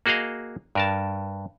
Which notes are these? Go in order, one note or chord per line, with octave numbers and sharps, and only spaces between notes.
A#3 F#4 G#4 D#5 F5
G2 A#4 A5